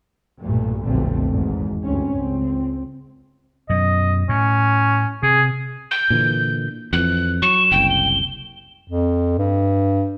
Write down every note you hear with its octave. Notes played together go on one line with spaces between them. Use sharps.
B1 G2 A#2 A3
F1 B1 A#2 D3 A3 C4
G#1 E2 G#2
D2 G2 C4 C#4
C#2 C4
F#2 B2 F#3 D#5
A2 C#4
C3 G#4
G6
A#2 D3 E3
F2 E3 F#6
F#3 C#6 E7
F#1 C2 G5
G7
F2
G2